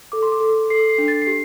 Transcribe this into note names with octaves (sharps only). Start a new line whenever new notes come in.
A4 D6
C6
D6
A4
A4 C7
C7
D4
A6
C7
G4